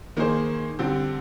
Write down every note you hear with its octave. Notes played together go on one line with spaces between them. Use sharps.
D#3 A#3 D#4 G#4 C5
D3 G3 C4 G4